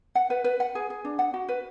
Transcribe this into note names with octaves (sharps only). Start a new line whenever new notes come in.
F#5
B4
B4
F#5
G#4
G#4
D4
F#5
F#4
B4